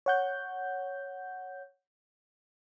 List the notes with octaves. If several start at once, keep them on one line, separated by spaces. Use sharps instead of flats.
C#5 F#5 G6